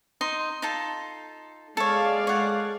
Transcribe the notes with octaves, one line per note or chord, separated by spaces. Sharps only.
D#4 D#5 C6
D#4 F4 A4
G#3 A4 C#5 D5 F5
C#5 F#5